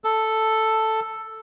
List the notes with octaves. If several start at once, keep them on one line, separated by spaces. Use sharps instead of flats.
A4